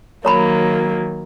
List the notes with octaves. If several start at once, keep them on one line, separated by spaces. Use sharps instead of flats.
D#3 F#3 A#3 C#5 A#5 B5